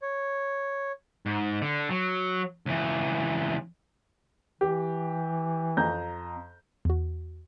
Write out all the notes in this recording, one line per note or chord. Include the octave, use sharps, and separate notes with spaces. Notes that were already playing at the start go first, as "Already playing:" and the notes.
C#5
G#2
D3
F#3
C#2 E3
E3 G4
F2 A#5 G6
E2 F#4